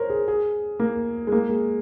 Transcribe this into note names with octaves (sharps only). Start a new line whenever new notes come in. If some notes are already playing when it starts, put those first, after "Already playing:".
Already playing: A#4 C5 C#5
G#4
G#4
A#3
G#3
A#3
G#3